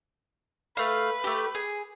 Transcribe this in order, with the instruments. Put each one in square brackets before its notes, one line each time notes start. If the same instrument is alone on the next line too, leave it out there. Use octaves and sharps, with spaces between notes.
[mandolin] A3 F5 [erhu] B4
[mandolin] A3 G4
G#4